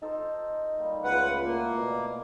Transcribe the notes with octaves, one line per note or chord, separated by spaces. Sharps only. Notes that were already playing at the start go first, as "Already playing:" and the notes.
D#4 A4 C5
G3 A#3
C#2 A3 A#3 F4 B4 F#5
A#3 E4
B2 D5